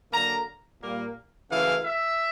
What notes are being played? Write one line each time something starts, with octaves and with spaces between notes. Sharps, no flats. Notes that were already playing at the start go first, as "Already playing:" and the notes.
D3 F#3 A#3 A#5
A#2 G3 A#3
F#2 C#3 E3 A3 F5
E5